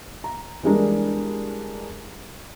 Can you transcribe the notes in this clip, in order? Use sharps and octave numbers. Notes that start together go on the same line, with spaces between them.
A#5
E3 G3 G#3 D4 A#4